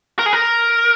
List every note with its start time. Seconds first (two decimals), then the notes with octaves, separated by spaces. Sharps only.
0.19 A#4
0.26 G#4
0.33 A#4